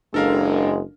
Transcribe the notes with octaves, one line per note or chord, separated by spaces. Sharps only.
F#1 G#3 D4 A4 A#4 F5